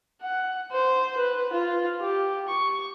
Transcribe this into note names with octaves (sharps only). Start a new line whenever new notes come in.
F#5
C5
B4
F4
G4
C#6